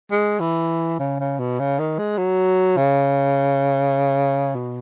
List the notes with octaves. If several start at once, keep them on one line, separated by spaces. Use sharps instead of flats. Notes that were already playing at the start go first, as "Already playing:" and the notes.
G#3
E3
C#3
C#3
B2
C#3
D#3
G#3
F#3
C#3
B2